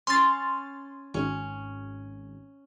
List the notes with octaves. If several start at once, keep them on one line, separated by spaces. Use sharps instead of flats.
C#4 C6 A6
G#1 C#4